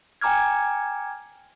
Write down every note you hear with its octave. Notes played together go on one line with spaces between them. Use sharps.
G5 G#5 A#5 D6 F6 G#6